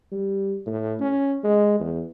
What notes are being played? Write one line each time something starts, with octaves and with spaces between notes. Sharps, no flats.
G3
A2
C#4
G#3
E2